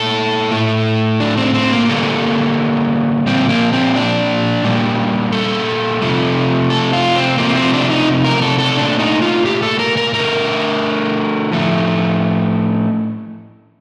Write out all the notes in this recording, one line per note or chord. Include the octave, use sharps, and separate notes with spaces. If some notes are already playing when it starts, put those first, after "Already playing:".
Already playing: A#2 A3 A4
A2 A3
D4
C4
C4
A#3
D3 G3 A#3 A4
A#2 F3 A#3 C4
A#3
C4
D4
A#2 G3 A#3
A4
C3 F3 A3
A4
F4
C4
C3 F3 A3 A#3
C4
D4
D#4
A#4
A4
A4
A#2 A3 D4
D#4
F4
G4
A4
A#4
A#4
D3 A3 A#4
A2 F3 A3